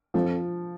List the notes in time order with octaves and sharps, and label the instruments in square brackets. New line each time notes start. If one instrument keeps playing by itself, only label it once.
[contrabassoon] F2 [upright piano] F3